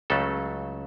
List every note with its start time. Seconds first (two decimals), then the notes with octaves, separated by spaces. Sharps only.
0.10 C#2 C#3 F#3 A3 A4